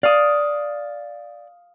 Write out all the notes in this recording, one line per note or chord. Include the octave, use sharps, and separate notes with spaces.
D5 F5 D#6